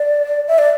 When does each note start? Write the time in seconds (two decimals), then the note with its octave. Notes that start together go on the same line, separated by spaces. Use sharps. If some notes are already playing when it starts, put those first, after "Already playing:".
Already playing: D5
0.48 E5
0.59 D5